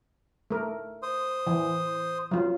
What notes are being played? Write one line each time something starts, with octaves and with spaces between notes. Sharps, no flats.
A3 A#4
C5 D#6
E3
F#3 F4